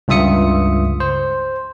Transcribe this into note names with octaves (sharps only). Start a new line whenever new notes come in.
C#2 G2 F4 E5 D#6 C#7
C5